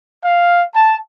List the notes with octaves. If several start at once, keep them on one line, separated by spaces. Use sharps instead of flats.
F5
A5